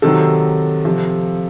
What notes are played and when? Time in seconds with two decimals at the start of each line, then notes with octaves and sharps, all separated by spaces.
0.02 C3 D#3 F#3 A4
0.85 C3 F3